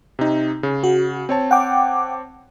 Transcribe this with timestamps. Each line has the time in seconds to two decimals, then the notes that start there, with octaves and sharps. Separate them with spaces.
0.19 C3 D#4
0.63 C#3
0.84 F#4
1.29 C4 C#5 A5
1.51 F#5 G5 D6